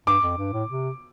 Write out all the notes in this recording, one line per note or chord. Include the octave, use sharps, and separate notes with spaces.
G2 D6
F2
G2
A2
C3